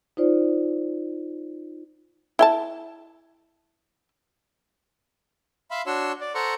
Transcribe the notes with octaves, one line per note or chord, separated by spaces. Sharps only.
D#4 F4 C5 D5
E4 G5 A5
E5 F5 B5 C6
D4 F#4 C#5 C6 E6
D5
A4 C5 F#5 A#5 C6 C#6